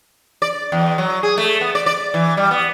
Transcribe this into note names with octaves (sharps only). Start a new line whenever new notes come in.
D5
E2
F#3
G#4
A3
B3
D5
D5
E3
G3
B3